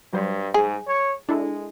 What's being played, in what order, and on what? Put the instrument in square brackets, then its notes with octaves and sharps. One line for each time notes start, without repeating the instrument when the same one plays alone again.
[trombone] G2 [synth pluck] F#3 G3 C5
[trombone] G#2 [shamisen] G#4
[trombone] C#5
[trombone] G#3 [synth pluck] D4 E4 A4